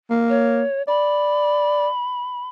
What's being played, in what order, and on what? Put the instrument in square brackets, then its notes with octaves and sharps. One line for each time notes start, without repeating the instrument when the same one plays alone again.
[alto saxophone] A#3
[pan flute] C#5
[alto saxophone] D5 [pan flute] B5